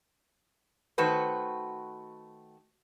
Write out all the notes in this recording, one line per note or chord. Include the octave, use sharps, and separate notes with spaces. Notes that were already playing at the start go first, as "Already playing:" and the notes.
D#3 A3 F#4 B4 C5